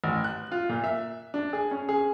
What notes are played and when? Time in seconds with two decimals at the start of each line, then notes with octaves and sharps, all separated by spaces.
0.04 A1
0.24 F#6
0.52 F4
0.69 A#2
0.84 E5
1.34 D4
1.53 G#4
1.71 C#4
1.89 G#4